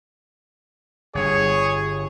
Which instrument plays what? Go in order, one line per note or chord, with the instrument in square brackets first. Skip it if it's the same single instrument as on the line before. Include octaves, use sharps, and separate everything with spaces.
[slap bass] G1 G2 [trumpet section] G#4 C#5